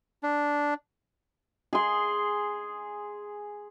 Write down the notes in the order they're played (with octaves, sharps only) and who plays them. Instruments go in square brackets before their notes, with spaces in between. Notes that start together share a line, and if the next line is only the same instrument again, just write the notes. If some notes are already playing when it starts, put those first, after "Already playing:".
[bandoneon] D4
[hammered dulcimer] G#4 C6